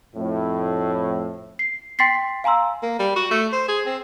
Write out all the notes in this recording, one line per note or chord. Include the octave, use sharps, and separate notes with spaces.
F2 A2
C7
G5 C6 A6 B6 C7
F5 G#5 A#5 C6 E6
A#3
G3
F#4
A3
C5
G#4
C4